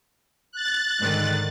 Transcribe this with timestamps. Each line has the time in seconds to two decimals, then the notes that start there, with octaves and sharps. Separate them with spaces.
0.52 F#6 A6
1.00 G#2 D3 D#3